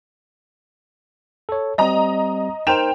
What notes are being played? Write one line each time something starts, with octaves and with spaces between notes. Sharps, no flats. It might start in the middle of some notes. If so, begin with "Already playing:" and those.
A4 C#5
G3 C4 D#5 A#5
D#4 A#4 C5 G5 E7 F7